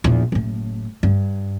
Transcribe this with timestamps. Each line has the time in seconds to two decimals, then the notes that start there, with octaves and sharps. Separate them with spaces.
0.04 A#1 E2
0.32 F#1 A2
1.03 G2